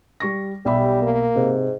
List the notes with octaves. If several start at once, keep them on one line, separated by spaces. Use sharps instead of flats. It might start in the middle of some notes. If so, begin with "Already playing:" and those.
G3 C#6 A#6
B1 G3 G4 E5 B5
A#3
G#2 C3